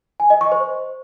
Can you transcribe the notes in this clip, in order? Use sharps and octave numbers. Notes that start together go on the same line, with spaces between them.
G#5
D#5
C#6
C5